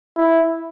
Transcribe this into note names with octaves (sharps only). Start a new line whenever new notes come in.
E4